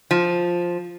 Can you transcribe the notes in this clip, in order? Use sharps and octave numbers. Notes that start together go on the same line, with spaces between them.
F3